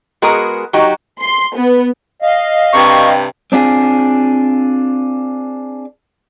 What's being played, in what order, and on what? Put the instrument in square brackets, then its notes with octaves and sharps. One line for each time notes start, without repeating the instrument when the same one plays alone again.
[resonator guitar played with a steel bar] G#3 B3 F#4 G#4 A#4
F#3 D#4 F#4 G4
[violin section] C6
B3
[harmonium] D#5 F5
[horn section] G2 C3 [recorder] C#6
[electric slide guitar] C4 D4 F4 G#4